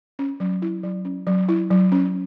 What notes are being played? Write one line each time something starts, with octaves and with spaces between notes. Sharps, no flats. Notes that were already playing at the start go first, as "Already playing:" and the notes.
C#4
F#3
E4
F#3
C#4
F#3
E4
F#3
C#4